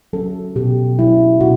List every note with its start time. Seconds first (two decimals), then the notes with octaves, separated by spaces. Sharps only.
0.13 F#3 C#4 A4
0.56 B2 G4
0.99 F#3 C#4 E4
1.40 B2 F#4